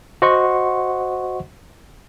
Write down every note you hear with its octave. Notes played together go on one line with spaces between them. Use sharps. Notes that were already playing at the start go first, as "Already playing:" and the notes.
F#4 C5 D#5 F#5 C6 C#6